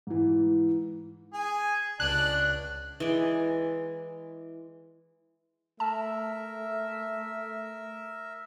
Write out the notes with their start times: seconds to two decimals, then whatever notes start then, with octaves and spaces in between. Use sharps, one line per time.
0.07 G#2 E3
1.34 G#4
2.00 C#2 D4 F#6
3.00 E3 G#3 D5
5.80 A3 A#4 E5 A5